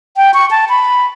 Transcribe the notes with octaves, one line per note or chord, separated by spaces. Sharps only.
G5
C#6
A5
B5